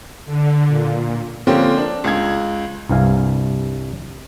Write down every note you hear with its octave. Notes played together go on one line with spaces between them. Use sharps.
D3
A#2
D3 F3 A#3 C4 C#4
D4
C#2 G#6
C2 G2 C3 F5 G#5